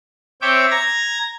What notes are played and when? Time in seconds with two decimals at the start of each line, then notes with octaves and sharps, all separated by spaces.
0.41 C4 C#5 E5 G5 D6
0.71 A#5 G#6 A#6